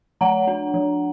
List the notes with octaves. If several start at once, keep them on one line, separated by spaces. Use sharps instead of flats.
F3 F#5 A#5
D4
F3